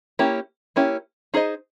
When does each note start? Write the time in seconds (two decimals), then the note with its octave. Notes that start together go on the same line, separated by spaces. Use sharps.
0.19 A#3 C#4 E4 G4
0.76 A#3 C#4 E4 G4
1.34 D#4 G#4 C5 D#5